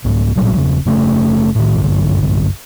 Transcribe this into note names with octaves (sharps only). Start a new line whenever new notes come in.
C2 G#2
A1 A#2 F#3 G3
E1 C#3
F#1 C#3 A3 C#4
A2 D#3
F#1 B1 G2 D3